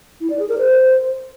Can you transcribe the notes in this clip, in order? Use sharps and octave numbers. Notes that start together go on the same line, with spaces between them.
E4
D5
G#4
A#4
C5